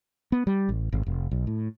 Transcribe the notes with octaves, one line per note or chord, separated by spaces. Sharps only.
B3
G3
A1
G#1
F1
B1
A2